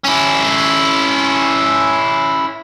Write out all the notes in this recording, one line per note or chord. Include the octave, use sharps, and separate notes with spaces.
C#4 E4